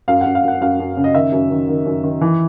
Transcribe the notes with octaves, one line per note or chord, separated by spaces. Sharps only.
F#2 F5
F#2 F#5
F5
F#2 F#5
F#2 F5
F#2
C#3
D#5
D#3 E5
F#2
D#3
D#3
F#2
D#3
E3